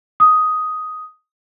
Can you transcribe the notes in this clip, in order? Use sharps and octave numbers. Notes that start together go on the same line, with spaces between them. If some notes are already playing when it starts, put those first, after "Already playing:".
D#6